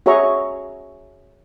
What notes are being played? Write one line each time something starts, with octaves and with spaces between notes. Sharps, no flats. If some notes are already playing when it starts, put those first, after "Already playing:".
F#4 G#4 C#5 E5 A#5 C#6